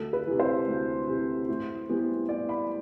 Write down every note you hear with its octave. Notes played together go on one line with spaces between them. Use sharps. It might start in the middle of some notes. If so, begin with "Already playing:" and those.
Already playing: D2 A4
B4
C3 E3
C5
D2
C3 E3
A2
E3 G3 B3
A2 D5
B5